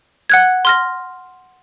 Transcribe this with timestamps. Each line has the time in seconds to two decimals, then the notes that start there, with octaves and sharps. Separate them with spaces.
0.30 F#5 F#6 G#6
0.65 C6 F6 A#6